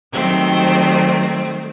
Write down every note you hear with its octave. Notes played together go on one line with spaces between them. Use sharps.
D#3 F#3 G3 A3 C4 C5